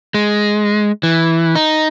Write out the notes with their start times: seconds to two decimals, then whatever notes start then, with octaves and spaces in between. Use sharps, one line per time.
0.14 G#3
1.03 E3
1.55 D#4